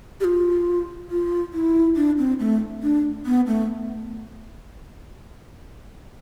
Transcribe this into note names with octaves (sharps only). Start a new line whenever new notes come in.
G4
F4
F4
E4
D4
C4
A3
D4
B3
A3